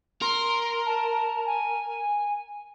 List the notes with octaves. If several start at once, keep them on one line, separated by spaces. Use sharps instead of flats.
A#4 C6
A5
G#5